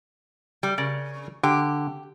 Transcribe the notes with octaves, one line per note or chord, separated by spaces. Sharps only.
G3
C#3 A#4 D5
D3 G4